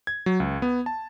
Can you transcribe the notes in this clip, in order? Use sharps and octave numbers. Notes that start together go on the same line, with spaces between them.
G#6
F#3
C#2
B3
A5